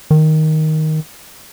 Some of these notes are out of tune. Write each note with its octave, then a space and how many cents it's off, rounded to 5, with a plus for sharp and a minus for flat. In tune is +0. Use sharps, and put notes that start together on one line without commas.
D#3 +5